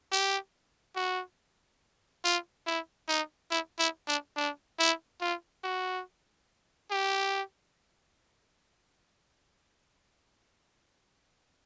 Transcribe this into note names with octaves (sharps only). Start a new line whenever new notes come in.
G4
F#4
F4
E4
D#4
E4
E4
D4
D4
E4
F4
F#4
G4